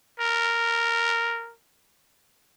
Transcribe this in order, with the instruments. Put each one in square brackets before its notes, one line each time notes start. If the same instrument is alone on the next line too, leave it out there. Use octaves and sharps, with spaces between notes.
[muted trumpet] A#4